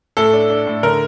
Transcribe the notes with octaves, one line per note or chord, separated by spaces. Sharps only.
A2 A4
D4
D4
A2
D3 A#4